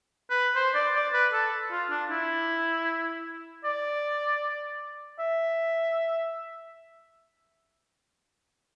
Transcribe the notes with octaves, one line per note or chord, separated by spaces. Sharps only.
B4
C5
D5
D5
B4
A4
F4
D4
E4
D5
E5